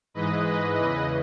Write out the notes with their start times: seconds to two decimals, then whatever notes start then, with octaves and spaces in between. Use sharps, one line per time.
0.14 G#2 E3 G#3 B4 D#5
0.45 B4 D#5
0.74 E2 C#3 E3 B4 D#5